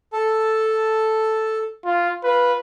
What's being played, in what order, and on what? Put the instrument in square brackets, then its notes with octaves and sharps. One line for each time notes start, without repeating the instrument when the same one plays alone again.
[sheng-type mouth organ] A4 A5
[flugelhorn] F4
[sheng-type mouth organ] F4 [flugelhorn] B4